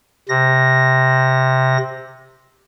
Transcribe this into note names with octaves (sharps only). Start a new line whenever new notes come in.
C3 A#6